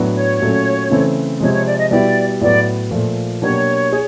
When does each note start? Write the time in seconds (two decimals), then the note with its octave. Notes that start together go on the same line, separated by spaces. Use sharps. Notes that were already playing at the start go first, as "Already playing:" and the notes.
Already playing: A2 F#3 B3 D4 F#4
0.15 C#5
0.40 A#2 F#3 A3 C#4
0.90 C#3 E3 A3 C4
1.40 C3 F3 G#3 C#5
1.53 C#5
1.66 D5
1.79 D#5
1.90 B2 G3 B3 E4 G4 D5
2.41 A2 F#3 B3 D5
2.91 A#2 F3 A3
3.42 B2 F#3 A#3 D4 G4 C#5
3.92 G#4